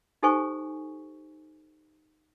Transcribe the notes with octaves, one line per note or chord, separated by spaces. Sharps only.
D#4 G4 A4 C5 G#5 C#6